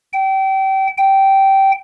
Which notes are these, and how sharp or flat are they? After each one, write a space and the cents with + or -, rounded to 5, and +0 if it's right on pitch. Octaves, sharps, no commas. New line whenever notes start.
G5 -30
G5 -15